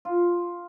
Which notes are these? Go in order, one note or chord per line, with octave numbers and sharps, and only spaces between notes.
F4